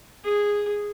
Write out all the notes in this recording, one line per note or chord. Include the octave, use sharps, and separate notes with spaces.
G#4